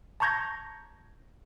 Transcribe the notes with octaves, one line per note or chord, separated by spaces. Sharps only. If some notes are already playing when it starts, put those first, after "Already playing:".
A5 A#5 C#6 G6 G#6 A#6